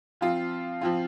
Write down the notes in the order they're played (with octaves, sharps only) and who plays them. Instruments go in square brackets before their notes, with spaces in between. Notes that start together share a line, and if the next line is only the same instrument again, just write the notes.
[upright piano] F3 C4 F4
F3 C4 F4